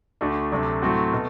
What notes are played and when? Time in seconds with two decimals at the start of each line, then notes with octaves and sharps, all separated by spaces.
0.21 D2 D3 A3 D4 F#4
0.52 D2 C3 F#3 A3 D4
0.82 A2 F#3 A3 C4 F#4
1.13 B2 A3